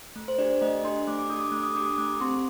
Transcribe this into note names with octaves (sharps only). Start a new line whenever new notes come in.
A3
C5
D4 G4 D5
D5
A3 D#5
D4 G4 C6
A3 D6
D6
D4 G4 D#6
D6
A3 D6
D#6
D4 G4 D6
D#6
A3 D6
C4 G4 C6